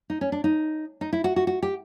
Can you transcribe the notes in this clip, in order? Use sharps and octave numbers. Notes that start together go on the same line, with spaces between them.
D#4
C#4
D4
D#4
D#4
E4
F#4
F#4
F#4
G4